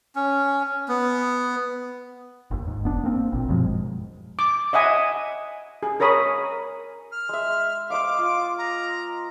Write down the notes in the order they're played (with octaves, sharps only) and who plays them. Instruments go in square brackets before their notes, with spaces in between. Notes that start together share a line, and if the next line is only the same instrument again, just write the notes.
[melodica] C#4
B3
[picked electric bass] G1 D#2
G#2
F1 B3 D4
A#3 C4
G#1 A#2
F#2 B2 F3 G#3
[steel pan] D6
D#5 E5 F#5 G#5 D#6
G#4
G#4 A#4 C#5 B5 D#6
[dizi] F6
[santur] G#3 E5
[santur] C5 D#5 F5 [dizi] D6
[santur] F4
[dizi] A#5